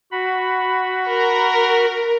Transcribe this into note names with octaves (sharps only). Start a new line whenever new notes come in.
F#4 B5
A#4